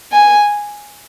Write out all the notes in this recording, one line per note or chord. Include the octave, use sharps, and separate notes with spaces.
G#5